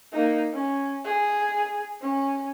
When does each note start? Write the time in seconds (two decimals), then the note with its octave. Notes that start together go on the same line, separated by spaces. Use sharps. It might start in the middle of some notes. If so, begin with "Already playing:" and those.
0.12 A#3 D#4
0.53 C#4
1.05 G#4
2.01 C#4